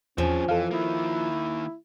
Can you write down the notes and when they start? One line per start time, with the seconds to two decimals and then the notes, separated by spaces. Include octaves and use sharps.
0.18 E2 F3 C4 C#4 G#4
0.49 F2 E3 A4 F5
0.71 D#3 A#3 E4